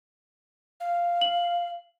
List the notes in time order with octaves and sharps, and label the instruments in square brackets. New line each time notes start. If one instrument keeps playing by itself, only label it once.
[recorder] F5
[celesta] F#7